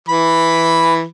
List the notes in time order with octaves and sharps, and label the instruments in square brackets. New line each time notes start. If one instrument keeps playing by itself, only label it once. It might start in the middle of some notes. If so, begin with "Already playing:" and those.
[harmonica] E3 B5